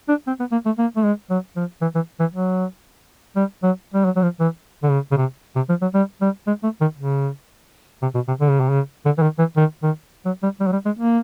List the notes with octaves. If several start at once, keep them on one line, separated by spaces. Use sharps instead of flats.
D4
C4
B3
A#3
A3
A#3
A3
G#3
F#3
F3
E3
E3
E3
F#3
G3
F#3
G3
F#3
F#3
F3
E3
D3
C#3
C#3
C3
C3
F3
F#3
G3
G3
G#3
A3
D#3
C#3
C3
B2
C3
D3
C#3
C3
C#3
D3
E3
D#3
E3
D#3
D#3
F#3
G3
G3
F#3
G3
G#3
A#3